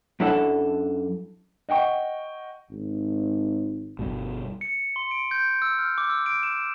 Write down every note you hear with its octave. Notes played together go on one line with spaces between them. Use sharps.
F#2 D4 E4 A4 F#5
D#5 F#5 G5 C#6
G#1
G1 G2 B2
C#7
C6
D7
G6
E6
F6
D6
E6
D7
E7